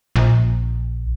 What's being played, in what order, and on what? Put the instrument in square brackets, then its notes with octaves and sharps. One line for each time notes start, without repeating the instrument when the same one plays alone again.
[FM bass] A#1